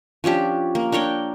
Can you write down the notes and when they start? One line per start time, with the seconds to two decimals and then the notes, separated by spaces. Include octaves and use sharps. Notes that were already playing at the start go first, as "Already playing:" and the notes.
0.24 F3 C#4 D4 G4
0.75 A#3
0.92 D4 A#4 C#5 G5